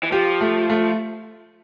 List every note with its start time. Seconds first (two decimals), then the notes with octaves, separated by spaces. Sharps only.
0.03 E3
0.12 F3 G4
0.41 A3
0.70 A3